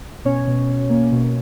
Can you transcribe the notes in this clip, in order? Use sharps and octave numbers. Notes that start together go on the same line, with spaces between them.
B2 C#4 C#5
B2
B2
A#3
B2